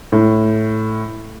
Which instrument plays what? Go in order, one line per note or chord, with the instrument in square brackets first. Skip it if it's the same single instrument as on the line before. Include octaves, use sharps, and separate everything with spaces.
[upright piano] A2